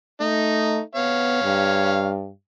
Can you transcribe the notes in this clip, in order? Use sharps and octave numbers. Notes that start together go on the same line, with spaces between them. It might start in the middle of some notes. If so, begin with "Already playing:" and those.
A3 D#4
B3 C#5 F5
G2